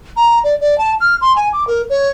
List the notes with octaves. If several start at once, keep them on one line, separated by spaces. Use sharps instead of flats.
A#5
D5
D5
A5
F6
C6
G#5
D6
A#4
C#5